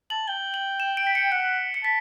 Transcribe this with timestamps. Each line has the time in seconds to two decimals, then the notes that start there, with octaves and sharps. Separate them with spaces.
0.10 A5 F#7
0.28 G5 G7
0.54 F#7
0.80 E7
0.97 D7
1.07 B6
1.15 C#7
1.32 F#5 C#7
1.74 C#7
1.84 A5 B6